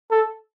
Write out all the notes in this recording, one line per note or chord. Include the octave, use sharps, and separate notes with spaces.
A4